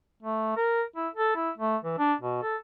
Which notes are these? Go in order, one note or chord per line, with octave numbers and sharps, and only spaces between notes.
A3
A#4
E4
A4
E4
A3
E3
D4
B2
A4